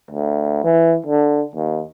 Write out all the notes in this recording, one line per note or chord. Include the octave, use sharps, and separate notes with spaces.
D2
E3
D3
D#2